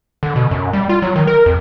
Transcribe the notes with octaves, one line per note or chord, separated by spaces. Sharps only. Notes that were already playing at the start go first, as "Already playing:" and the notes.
D3
B2
F#2
G3
F4
F#3
D#3
A#4
F2